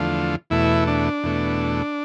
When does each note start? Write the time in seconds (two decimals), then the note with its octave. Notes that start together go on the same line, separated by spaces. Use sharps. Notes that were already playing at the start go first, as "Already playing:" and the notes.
Already playing: E2 D3 F3 A3 F4
0.50 E2 B2 A3 E4
0.87 D4
1.23 E2 B2 A3